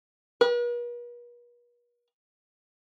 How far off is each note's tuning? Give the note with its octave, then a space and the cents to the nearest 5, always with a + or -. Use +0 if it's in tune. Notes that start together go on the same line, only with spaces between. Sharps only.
B4 -45